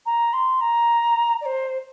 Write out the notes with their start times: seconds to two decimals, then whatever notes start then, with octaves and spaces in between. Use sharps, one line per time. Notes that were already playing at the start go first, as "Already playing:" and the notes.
0.06 A#5
0.33 C6
0.61 A#5
1.41 D5
1.45 C5